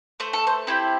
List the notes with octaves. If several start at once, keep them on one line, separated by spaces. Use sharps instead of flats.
A3 C5
A4
C5
C4 E4 G4